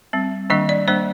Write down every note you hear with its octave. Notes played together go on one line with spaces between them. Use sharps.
G3 C4
D#3 G3 A#3 D4 D#5
D5
G3 A#3 D4 C5